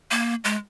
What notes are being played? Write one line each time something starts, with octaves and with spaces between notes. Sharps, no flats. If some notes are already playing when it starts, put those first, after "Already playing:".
A#3
G#3